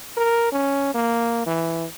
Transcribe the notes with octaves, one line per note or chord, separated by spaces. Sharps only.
A#4
C#4
A#3
E3